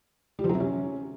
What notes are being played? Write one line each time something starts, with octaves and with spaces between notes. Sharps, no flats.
G3
F3
F#3
C3
C#4